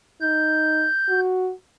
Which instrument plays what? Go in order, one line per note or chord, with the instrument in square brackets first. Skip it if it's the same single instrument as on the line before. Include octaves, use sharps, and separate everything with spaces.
[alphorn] D#4 [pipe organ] G6
[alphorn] F#4